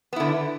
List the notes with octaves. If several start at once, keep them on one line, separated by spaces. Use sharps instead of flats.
D3 B3 E4